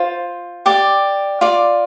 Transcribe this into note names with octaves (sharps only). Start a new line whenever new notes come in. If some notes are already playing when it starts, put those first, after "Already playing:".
Already playing: F4 C5
G4 D5 D6
F4 D5